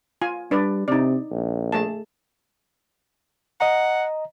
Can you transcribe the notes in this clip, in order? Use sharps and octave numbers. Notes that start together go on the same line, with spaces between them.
F4 G#5
G3 D4 B4 D5
C3 D#4 D5
A#1
A3 G#4 A5
D#5 F#5 A#5